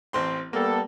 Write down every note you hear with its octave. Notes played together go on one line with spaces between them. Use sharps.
A1 C4 C6
G3 A#3 B3 A4